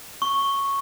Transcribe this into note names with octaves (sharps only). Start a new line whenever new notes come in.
C#6